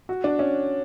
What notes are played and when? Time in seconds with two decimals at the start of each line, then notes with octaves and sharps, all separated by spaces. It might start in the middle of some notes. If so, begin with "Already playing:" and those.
0.09 F#4
0.24 D4
0.39 C#4